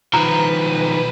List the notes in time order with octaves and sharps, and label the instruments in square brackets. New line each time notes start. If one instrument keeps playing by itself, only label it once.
[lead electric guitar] B1 B4 [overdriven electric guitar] D#3 F3 [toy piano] A#5